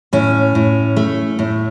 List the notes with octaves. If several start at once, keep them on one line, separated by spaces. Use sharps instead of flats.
A2 C#4
A2
A3
A2